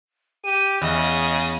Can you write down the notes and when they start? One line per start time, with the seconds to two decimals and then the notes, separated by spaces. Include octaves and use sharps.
0.44 G4 D#7
0.82 E2 C#3 D#5